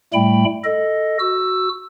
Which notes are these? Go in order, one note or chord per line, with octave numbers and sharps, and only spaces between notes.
A2 G3 A3 G5 B5
A4 D#5
F#4 E6